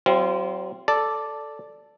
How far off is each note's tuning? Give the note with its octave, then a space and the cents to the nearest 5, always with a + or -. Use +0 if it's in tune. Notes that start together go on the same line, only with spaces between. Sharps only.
F#3 +40 C4 +0 F4 -30
A4 +0 D5 +0